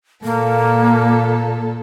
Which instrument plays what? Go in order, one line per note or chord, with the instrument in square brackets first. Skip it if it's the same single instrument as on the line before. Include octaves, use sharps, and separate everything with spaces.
[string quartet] A#2 A4 [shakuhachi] A#3